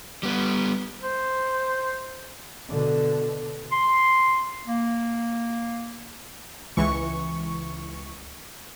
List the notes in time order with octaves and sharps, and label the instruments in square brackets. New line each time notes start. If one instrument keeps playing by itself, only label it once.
[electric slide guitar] G3 B3
[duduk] C5
[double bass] B2 D3
[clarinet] C6
A#3
[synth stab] C#2 E3 C#6